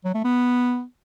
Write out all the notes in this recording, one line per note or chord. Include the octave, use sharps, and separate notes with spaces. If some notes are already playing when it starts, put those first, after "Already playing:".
F#3
A3
B3